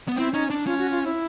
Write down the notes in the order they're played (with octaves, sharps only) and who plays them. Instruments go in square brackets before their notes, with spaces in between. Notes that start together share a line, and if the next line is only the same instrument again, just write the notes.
[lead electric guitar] B3
[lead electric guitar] C4 [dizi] E4
[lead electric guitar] C#4 [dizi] D#4
[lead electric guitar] D4
[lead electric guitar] C#4 [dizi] F4
[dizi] F#4
F4
E4